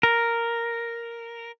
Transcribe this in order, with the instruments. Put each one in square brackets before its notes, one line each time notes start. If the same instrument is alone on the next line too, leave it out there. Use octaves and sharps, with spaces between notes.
[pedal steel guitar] A#4